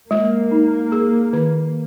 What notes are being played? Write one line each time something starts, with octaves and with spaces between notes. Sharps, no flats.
G#3 A#3
D#4
G#4
D#3